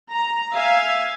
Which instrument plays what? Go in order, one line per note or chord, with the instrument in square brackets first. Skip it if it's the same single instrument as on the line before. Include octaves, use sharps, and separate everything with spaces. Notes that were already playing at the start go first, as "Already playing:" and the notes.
[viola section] A#5
E5 F5 G#5